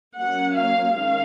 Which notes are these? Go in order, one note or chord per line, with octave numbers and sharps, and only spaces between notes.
F#3 A#3 C#4 F#5
F5
D#3 G#3 C#4 F5